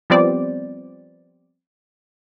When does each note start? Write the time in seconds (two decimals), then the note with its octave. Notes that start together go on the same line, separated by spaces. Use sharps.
0.10 F3 G3 B3 C4 C5 D5